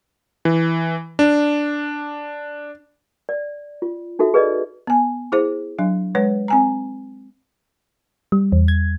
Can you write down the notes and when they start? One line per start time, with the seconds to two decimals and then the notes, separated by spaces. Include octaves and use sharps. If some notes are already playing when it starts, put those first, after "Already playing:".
0.45 E3
1.19 D4
3.29 D5
3.82 F4
4.19 D#4 F#4 A4 E5
4.34 G#4 B4 D5 D#5
4.87 B3 G#5
5.32 E4 G#4 C5
5.79 F#3 D4
6.15 G#3 B4 C#5
6.48 C4 G#5 A#5
8.32 G3
8.52 E2
8.68 G#6